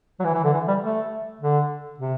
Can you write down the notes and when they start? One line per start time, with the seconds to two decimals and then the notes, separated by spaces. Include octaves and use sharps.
0.20 F#3
0.24 E3
0.34 E3
0.44 D3
0.53 E3
0.68 G3
0.83 A3
1.41 D3
1.99 C3